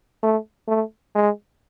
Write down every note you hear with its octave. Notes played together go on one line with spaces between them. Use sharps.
A3
A3
G#3